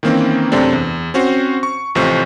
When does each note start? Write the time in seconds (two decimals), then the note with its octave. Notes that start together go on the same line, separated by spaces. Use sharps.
0.03 D#3 E3 A#3 C4 C#4
0.52 F#2 C3 A3 C4 D4
0.73 E2
1.14 C4 C#4 F#4 C5
1.63 C#6
1.95 A1 C3 F3 A3 C5 C#6